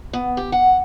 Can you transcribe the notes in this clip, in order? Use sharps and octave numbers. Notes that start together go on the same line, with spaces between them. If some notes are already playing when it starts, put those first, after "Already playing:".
B3
G4
F#5